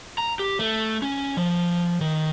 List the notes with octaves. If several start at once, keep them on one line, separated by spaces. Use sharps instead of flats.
A#5
G4
A3
C#4
F3
D#3